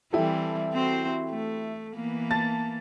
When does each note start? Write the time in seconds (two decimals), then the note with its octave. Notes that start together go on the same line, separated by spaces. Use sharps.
0.13 E3 G3 C4 E4 G4 A4
0.73 C4 F#4 C5
1.30 A3
1.94 E3 A#3 B3
2.31 A5 A6